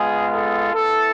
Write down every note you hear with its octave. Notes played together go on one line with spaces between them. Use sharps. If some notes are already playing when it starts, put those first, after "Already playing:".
Already playing: G#3 B3 F4 G#4
A4
B3 E4 A4